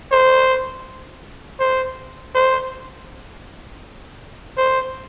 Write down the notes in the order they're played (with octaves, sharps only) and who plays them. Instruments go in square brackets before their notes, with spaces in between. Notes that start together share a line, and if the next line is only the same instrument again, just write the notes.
[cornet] C5
C5
C5
C5